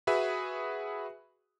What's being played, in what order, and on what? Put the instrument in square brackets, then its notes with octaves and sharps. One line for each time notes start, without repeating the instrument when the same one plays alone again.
[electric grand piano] F#4 G#4 B4 E5